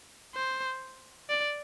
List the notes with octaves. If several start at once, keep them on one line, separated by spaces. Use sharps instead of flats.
C5
D5